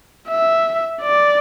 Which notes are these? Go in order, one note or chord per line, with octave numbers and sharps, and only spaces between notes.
E5
D5